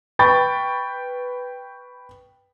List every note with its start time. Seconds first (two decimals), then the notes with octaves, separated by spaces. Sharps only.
0.19 B4 G5 B5 C#6 A6